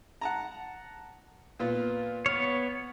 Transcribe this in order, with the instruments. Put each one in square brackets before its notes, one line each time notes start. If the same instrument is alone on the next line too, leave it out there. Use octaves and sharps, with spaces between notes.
[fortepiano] F#5 A5 A#5
A#2 B3 F4
[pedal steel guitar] B3 C#5 [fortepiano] F6